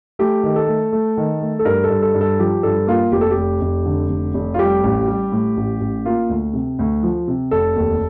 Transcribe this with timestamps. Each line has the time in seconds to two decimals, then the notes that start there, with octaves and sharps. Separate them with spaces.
0.19 A3 G4
0.43 D#3
0.56 A4
0.67 A3
0.92 A3
1.17 D#3
1.42 A3
1.59 A4
1.65 G2 A#4
1.84 A4
1.90 G2
2.02 A4
2.14 G2
2.21 A4
2.39 F3 G4
2.63 G2 A4
2.87 A#3 F4
3.12 F1 G4
3.21 A4
3.31 G4
3.37 F1
3.61 F1
3.86 D3
4.09 F1
4.34 F1
4.54 F4
4.58 G3 G4
4.83 A1
5.07 G3
5.32 A2
5.57 A1
5.81 A1
6.06 A#3 F4
6.29 D2
6.54 C3
6.79 D2
7.03 F3
7.28 C3
7.51 F1 A4
7.76 D#2